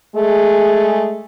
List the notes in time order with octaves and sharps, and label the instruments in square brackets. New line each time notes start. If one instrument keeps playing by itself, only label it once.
[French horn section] G#3 A3 G#4